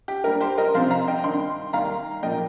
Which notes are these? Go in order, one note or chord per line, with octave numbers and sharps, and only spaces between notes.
G4
G2 G3 A#3 A#4
G4 C5
A#4 D#5
C2 C3 F3 C5 F5
F5 A#5
D#5 G5
G2 D#3 G3 G5 C6
D#2 D#3 G3 A#3 F5 A#5
A#2 F3 A#3 D#5 G5